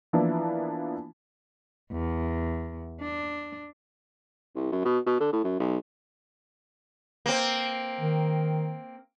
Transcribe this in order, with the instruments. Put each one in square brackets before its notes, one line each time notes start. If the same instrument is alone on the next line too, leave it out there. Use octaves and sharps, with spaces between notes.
[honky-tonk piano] E3 F3 A#3 B3 D4 E4
[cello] E2
D4
[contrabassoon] C2
F#2
B2
B2
D3
A2
F#2
B1
[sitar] A#3 C4
[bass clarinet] D#3